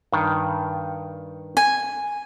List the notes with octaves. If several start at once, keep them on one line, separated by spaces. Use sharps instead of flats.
G2 D#3
G#5